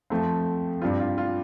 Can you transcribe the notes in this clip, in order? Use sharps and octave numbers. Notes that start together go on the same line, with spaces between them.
F2 F3 A3 C4
G2 G3 C4 F4
F4
F4